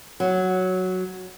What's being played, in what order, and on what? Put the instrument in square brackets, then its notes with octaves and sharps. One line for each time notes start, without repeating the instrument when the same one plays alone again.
[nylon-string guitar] F#3